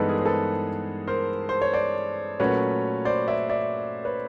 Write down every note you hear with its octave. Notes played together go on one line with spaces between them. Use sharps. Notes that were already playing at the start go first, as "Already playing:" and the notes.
Already playing: G2 E3 G#3 B3 D#4 A4 B4
G#4 A#4
C5
A4 B4
A#4 C5
C5
C#5
C5 D5
A#2 F#3 A3 C#4 B4 C#5
C5 D5
D5 E5
D5 E5
B4 C#5